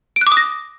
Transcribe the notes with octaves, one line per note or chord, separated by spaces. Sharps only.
D7
F#6
D6
D#6
A#6